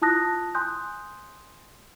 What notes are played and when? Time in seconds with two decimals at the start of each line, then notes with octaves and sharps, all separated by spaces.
0.02 E4 F4 A5 D#6 F#6 A#6
0.55 G#5 C6 D#6 F#6 G6